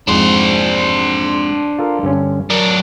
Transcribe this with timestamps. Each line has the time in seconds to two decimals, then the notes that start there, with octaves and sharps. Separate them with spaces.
0.08 F2 G#2 D4 C5
1.79 F4 A4 A#4
2.03 G2 D3 C#4
2.50 F#2 D4 A#4